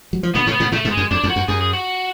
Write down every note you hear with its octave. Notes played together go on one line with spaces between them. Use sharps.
F#3
F3
B2 D3 B3
A2 C#3 C#4
B3
A2 C#3
A2 C#3 A3
G#2 B2
G#3
F#2
F2 D4
F2
F#4
F#2
F#2 G#4
G#4
F#4